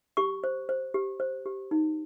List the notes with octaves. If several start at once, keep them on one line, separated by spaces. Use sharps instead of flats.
G4 C#6
C5
C5
G4
C5
G4
D#4